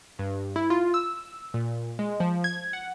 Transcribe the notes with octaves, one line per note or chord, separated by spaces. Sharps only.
G2
E4
F4
E6
A#2
G#3
F3
G#6
F#5